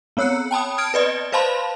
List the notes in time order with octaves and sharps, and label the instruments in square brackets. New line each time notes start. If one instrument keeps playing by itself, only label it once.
[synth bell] B3 C4 C#5 E6 F#6 C#7
G5 A5 B5 D#6
D#6 F6 G#6 D7
B4 D5 D#5
B4 C5 F5 A5 B5 C6